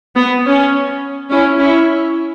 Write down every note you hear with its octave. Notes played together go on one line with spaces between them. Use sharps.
B3
C#4
C#4 E4
C#4 E4